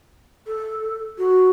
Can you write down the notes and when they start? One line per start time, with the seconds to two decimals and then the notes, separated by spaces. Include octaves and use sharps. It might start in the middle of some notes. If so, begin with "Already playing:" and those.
0.47 A4
1.18 F#4